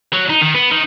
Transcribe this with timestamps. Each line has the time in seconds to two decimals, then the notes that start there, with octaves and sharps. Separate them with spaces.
0.13 F#3
0.30 D#4
0.42 D#3
0.55 B3
0.71 D#3